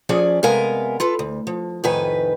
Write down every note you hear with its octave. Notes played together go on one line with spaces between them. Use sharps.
F3 C#4 G#4 D5
C3 G#3 B3 A#4 F5 G#5
F4 A4 B4
D2
F3
F2 A2 C3 D#3 B4 G#5